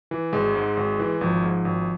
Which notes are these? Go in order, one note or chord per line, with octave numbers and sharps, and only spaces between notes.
E3
G#1 G#3
G#2
G#1
E3
G#1 F3
G#2
G#1